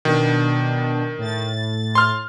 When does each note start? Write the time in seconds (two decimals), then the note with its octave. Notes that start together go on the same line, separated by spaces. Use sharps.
0.05 B2 D#3 D4
1.18 A2 A6
1.95 C6 F6